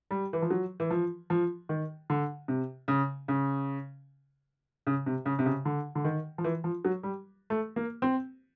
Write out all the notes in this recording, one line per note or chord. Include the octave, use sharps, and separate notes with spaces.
G3
E3
F3
F#3
E3
F3
F3
D#3
D3
C3
C#3
C#3
C#3
C3
C#3
C3
C#3
D3
D3
D#3
F3
E3
F3
F#3
G3
A3
A#3
C4